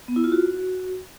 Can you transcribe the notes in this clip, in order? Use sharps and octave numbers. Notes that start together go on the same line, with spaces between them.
B3
E4
F4
F#4